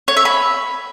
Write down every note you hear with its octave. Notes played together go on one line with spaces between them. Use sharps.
C#5
E5
B5